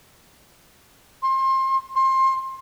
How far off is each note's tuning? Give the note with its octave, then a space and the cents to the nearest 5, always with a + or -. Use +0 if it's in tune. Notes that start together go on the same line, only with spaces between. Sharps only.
C6 +30
C6 +25